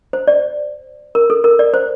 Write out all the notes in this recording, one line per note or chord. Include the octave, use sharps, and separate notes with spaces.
C5
D5
A#4
A4
A#4
D5
C5